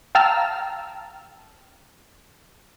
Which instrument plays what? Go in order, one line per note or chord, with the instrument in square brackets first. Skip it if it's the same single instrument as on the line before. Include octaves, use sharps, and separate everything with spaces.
[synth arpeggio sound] F5 G5 A5 A#5 E6 F6